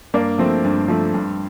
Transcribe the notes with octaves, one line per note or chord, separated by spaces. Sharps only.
G2 A#3 D4
F3 A3 C4
G2
F3 A3
G2